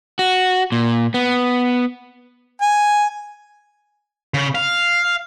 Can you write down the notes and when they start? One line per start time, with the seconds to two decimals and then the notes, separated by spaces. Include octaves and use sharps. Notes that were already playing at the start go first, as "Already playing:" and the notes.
0.19 F#4
0.72 A#2
1.14 B3
2.61 G#5
4.34 C#3
4.55 F5